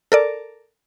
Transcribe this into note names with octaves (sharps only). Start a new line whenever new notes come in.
A4 A#4 D5